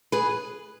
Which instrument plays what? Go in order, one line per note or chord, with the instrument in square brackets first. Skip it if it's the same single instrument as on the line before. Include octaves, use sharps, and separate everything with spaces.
[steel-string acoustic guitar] G#4 B4